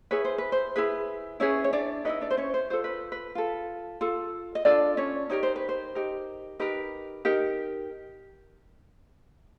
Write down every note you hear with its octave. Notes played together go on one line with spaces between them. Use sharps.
E4 G#4 B4 C#5
C5
B4
C5
E4 G#4 B4
C#4 E4 G#4 B4 C#5
C#5
D4 D5
D#4 E4 G#4 B4 D#5
D4 D5
C5
C#4 C#5
C5
F4 A4 C5
B4
B4
F4 A4
F4 A4
D#5
D4 F4 A4 D5
C#4 C#5
D#4 G4 A#4 C#5
C5
B4
C5
D#4 G4 A#4
D#4 G4 A#4 B4
D#4 G4 A#4